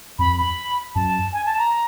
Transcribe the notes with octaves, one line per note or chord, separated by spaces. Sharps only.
F2 B5
B5
F#2 A5
G#5
A5
A#5